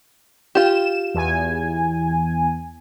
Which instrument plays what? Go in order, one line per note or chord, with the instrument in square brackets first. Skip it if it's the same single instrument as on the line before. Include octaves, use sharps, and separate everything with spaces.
[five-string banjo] F4 G4 [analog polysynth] E7
[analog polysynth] E2 G#5